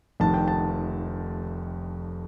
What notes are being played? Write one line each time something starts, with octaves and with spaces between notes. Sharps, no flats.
F1 F2 D#3 A5
G5
A5